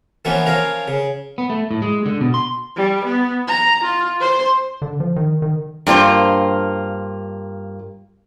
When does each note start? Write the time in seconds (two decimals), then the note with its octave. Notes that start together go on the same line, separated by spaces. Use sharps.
0.25 E3 F3 A#3 B3 C#4
0.46 F3 C#4 A#4 F5
0.88 C#3
1.38 B3
1.50 A3
1.71 A2
1.82 G#3
2.06 D3
2.21 B2
2.34 C6
2.76 G3
3.05 B3
3.48 A#5
3.85 F4
4.20 C5
4.82 D3
5.00 F3
5.16 D#3
5.42 D#3
5.87 G2 A#3 F4 C5